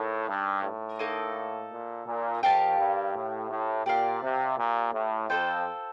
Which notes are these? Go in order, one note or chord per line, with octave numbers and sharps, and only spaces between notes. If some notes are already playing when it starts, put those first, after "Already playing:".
Already playing: A2 D#4 A#4 D#5 A5
G2
A2
A#3 D#4 A4 D#5
A#2
A#2
F2 G4 A#4 F5 A5
G2
A2
A2
A#2 G4 D5 F5
C3
A#2
A2
F2 F4 A4 C5 G5